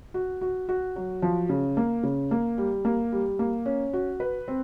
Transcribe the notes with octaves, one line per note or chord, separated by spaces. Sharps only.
F#4
F#4
F#4
F#3
F3
C#3
A#3
C#3
A#3
G3
A#3
G3
A#3
C#4
F#4
B4
C4